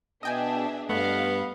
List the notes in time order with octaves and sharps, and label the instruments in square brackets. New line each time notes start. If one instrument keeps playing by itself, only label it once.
[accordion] B2 [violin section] D4 G#4 E5 [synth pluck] D#5 G5 G#5
[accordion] G2 [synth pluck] A3 [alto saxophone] B3 [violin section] D#5 F5